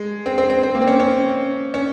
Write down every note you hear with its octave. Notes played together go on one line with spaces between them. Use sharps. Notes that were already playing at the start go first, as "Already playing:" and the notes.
Already playing: G#3
C4
C4
C4
C4
A#3
C4
C#4
C#4
C#4